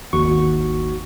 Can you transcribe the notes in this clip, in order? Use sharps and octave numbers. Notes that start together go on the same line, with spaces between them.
G#1 D#2 F#4 C#6